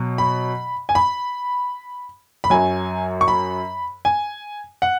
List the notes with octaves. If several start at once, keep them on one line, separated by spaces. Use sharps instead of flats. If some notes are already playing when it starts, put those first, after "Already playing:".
Already playing: B2 F#3
B5
G#5
B5
B5
F#2 F#3 G#5
C#6
B5
G#5
F#5